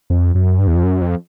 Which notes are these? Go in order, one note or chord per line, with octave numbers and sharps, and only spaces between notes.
F2
F#2
G2
E2
F2
F#2
F2